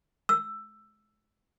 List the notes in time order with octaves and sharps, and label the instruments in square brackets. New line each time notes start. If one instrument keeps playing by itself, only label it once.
[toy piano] E6